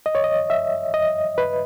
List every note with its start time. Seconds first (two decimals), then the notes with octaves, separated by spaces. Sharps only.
0.06 D#5
0.15 C#5
0.24 D#5
0.50 E5
0.94 D#5
1.38 B4